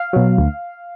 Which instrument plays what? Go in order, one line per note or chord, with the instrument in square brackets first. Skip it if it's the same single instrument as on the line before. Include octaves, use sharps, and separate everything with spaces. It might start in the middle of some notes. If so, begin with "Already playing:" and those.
Already playing: [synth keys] F5
B2 F#3
D2